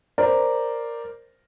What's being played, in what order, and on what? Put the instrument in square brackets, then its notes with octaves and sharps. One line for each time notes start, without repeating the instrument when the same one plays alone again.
[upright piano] A#4 C5 D5